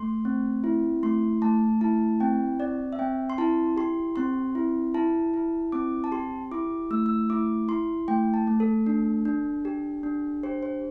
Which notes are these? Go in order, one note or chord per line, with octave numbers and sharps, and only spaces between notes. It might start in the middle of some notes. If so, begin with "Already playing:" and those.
Already playing: A3 C6
C4
E4
A3 C6
A3 A5
E4 A5
C4 G5
C4 D5
E5
C4 G5
C6
E4 A5
G4 C6
C4 C6
E4
E4 A5
E4
C4 D6
A5
G4 C6
E4 D6
A3 E6
E6
E4 D6
E4 C6
A3 G5
A5
A3
A4
D4
D4
G4
D4
G4 C5
C5